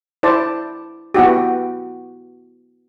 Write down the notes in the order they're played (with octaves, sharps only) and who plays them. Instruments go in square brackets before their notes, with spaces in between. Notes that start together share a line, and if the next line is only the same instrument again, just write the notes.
[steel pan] E4 C5 D5 A5
B3 E4 F#4 G4